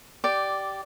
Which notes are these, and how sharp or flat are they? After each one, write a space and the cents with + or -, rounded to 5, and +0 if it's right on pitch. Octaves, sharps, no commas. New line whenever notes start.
G4 -15 D5 +0